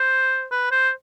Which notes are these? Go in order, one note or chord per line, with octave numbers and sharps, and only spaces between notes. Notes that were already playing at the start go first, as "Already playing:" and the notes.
Already playing: C5
B4
C5